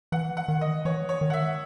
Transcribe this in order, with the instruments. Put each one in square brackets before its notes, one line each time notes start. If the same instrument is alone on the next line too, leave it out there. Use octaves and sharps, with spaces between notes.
[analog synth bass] E3 [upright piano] F#5
[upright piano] F#5
[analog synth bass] D#3
[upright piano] D#5
[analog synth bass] E3 [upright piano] C#5
[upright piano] C#5
[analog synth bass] D#3
[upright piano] F#5
E5